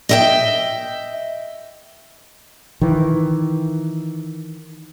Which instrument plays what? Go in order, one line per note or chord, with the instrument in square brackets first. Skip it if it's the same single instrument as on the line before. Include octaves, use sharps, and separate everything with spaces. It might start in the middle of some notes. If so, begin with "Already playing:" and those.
[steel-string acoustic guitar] D#5 E5 G5
[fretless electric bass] D#3 E3